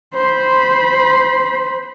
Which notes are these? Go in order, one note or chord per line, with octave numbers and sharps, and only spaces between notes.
C5 B5